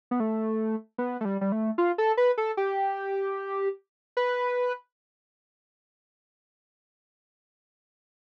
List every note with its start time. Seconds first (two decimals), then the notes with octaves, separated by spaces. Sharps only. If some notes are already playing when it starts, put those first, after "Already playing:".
0.11 B3
0.20 A3
0.98 B3
1.21 A3
1.25 G3
1.41 G3
1.52 A3
1.78 F4
1.98 A4
2.17 B4
2.38 A4
2.57 G4
4.17 B4